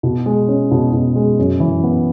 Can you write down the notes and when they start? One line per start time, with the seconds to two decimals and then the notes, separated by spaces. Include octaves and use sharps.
0.03 B2
0.26 G#3
0.48 C#4
0.71 B2
0.93 B2
1.15 G#3
1.39 F#2
1.60 E3
1.83 B3